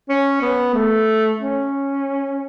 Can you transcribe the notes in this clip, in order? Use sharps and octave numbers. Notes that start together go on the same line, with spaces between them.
C#4
B3
A3
C#4